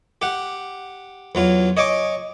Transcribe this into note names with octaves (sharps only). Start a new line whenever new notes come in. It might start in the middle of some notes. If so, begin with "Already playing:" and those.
G4 F#5
E2 F#3 F4
C#5 D#5 G#5 C#6 D6